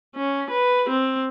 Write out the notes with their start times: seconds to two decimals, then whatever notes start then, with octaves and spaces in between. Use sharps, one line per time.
0.16 C#4
0.51 B4
0.89 C4